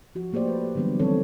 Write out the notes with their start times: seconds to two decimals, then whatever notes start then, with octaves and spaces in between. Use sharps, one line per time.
0.15 F3 F#4
0.33 A3 A#3 G4 C5 D5
0.48 B4
0.75 D3 E3 F#3 G3 B3
0.99 D#3 E3 G3 C4 A4 C#5